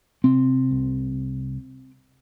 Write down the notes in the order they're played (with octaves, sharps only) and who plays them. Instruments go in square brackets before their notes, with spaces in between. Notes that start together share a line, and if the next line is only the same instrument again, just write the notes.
[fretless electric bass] C3 C4
C2